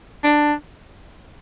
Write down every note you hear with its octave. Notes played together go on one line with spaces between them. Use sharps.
D4